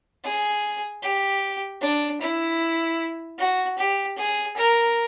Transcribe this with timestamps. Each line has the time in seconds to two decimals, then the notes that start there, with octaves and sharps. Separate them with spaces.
0.24 G#4
1.03 G4
1.82 D4
2.21 E4
3.39 F#4
3.78 G4
4.18 G#4
4.56 A#4